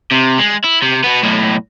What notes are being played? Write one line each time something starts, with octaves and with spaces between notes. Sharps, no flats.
C3
G#3
E4
C3
B2 B3
B1 A2